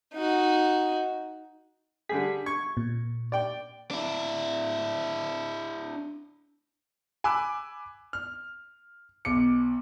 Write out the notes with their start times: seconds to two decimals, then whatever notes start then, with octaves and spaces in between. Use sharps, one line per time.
0.14 D#4 F#4
2.09 D3 G3 G#4 B6
2.46 C#6 G#6
2.77 A#2
3.32 D5 G5
3.91 D4 E4
7.24 G#5 B5 D6 E6 F#6
8.13 F6
9.25 B1 D6 C#7